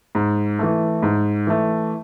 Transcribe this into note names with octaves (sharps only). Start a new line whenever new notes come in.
G#2
E3 A3
G#2
E3 A3